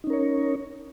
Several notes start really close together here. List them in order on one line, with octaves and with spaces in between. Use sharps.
D#4 C#4 A#4 C#5